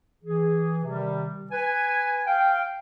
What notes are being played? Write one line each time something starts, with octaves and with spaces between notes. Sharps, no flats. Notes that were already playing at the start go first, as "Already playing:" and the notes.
E3 G#4
C3 D#3 G3
B4 G#5
F5 G5